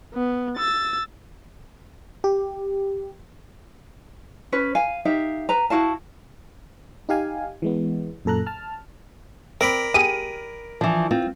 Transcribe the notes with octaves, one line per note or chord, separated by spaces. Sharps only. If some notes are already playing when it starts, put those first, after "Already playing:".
B3
E6 A6
G4
C#4 B4
F5 G#5
D#4 G4 E5 F5
B4 A#5
E4 F#4 F5 A5
D#4 G4 F5 G#5
E3 G#3 B3
F#2 A#2 A4 A#5 F#6
A5 F6
C4 A#4 D5 B5
G4 G#4 D#7
E3 F3 D4
C4 F4